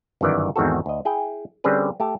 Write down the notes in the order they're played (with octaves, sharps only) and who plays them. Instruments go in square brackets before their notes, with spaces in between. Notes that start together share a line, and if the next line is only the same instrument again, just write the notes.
[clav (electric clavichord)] G1 F#2 D#3 E3 D5
E2 G#2 D#3 C4 F#4 A4
D2 D#5
E4 G#4 G5
D3 G3 C4 C#4 G#4 B4
A3 G4 A5